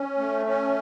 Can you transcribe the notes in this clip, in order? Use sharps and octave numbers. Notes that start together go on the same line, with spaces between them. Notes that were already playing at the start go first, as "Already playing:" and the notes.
Already playing: C#4
A3
C#4